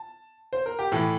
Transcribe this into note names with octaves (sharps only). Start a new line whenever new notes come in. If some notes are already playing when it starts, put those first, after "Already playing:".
Already playing: A5
C5
A#4
G4
A2 E3 A4